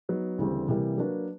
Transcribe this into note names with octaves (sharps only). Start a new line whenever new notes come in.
F#3 B3 D#4
D2 C#3 E3 G3 C4
C3 E3 G3 A#3
F#3 A#3 D4 F#4 B4